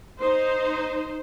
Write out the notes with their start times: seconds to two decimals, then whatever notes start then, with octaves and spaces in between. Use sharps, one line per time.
0.20 D#4 C5